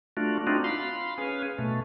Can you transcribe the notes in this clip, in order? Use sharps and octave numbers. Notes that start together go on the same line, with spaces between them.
A3 D4 F4 F#4
C4 D4 D#4 F4 F#4
F5 B5 C6
C#4 G#4 B4 F5
B2 A3